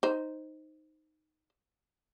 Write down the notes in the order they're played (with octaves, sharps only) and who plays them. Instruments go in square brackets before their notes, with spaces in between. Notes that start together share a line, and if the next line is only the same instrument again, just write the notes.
[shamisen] D#4 C5